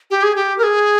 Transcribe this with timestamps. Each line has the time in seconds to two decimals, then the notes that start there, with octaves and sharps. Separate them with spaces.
0.11 G4
0.23 G#4
0.36 G4
0.58 A#4
0.63 G#4